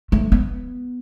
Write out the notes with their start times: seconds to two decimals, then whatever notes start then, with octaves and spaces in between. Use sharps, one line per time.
0.12 A3
0.32 B3